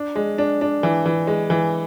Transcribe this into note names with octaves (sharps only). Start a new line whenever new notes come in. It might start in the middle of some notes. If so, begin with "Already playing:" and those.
Already playing: D4
G#3
D4
D4
E3
E3
G#3
E3